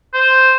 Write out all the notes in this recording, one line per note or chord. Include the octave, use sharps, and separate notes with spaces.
C5